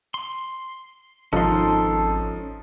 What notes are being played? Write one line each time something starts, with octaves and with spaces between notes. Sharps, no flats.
C6
G#1 F3 C#4 D#4 F4 A4 C6